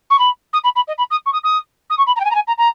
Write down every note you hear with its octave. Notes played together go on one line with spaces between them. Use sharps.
C#6
B5
D#6
B5
B5
D#5
B5
D#6
C#6
D#6
D#6
D#6
C#6
B5
A#5
G5
G#5
A#5
G#5
A#5
A#5